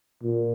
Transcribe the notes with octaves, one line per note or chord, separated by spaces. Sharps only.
A#2